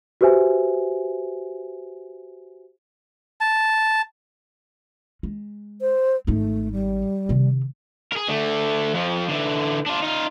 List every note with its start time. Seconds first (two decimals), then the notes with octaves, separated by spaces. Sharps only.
0.21 F#4 G4 B4 C5 E5 G#5
3.41 A5
5.23 G#3
5.81 C5
6.27 G#1 A3 D#4
6.72 G3
7.29 C3 D#3
8.12 G#4 A#4
8.28 D3 A3
8.94 F2 F3
9.28 D3 E3
9.86 D4 F4
10.03 D#4 F4